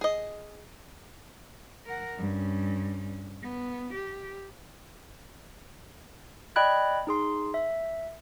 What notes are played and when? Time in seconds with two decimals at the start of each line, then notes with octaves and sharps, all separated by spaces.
0.01 G#4 D#5
1.86 A#4 F#5
2.18 G2 C#4
3.42 B3
3.94 G4
6.56 D5 D#5 G5 B5 F#6 G#6
7.07 D#4 G#4 C6
7.54 E5